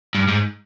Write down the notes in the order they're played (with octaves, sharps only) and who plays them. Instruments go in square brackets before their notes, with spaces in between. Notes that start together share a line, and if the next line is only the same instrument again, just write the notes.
[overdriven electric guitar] G2
G#2